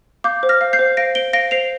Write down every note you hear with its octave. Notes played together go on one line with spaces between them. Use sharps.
F5 D6 G6
C5
F6 A#6
F5
G6 C7
C5
F5 A#6 D7
C5 D7 G7
F5 A#6 D7
C5 C7 F7